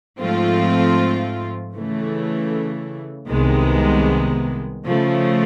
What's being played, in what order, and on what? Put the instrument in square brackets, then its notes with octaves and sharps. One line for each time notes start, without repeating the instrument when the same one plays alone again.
[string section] G#2 F3 A3 C4 F4
C#3 E3 A3
C2 C3 D#3 G#3 B3
C#3 F3 A3